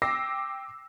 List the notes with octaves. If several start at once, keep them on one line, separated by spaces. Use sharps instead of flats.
G5 D6 E6 A#6 C7